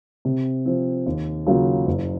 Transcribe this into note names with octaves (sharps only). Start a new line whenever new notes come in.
C3
F3 C4
D#2
C#3 F#3 A#3 F4
F#1